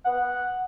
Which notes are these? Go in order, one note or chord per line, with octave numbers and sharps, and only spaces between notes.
B3 F#5